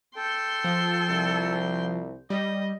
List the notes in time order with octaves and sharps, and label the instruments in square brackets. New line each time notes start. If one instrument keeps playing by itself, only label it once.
[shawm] A4 [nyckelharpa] G5 C6
[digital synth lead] F3
[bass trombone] C2
[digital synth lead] G3 [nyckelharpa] D#5